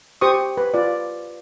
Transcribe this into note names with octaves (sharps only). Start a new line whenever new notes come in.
G4 C5 C#6 D#6
B4
F4 D5